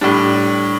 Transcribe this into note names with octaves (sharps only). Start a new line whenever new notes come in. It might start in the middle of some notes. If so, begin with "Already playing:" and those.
A2 G3 D4